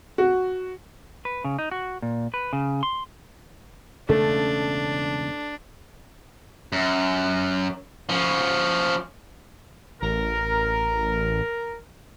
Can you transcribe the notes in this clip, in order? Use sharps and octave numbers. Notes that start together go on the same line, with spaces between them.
F#4
B4
C#3
D#4
F#4
A#2
B4
C#3
C6
E1 C#3 A3 C#4 D4
F#2
F3 C#4
A1 A#4